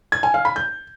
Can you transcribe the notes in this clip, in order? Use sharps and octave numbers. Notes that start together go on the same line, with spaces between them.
G#6
G#5
F5
B5
G6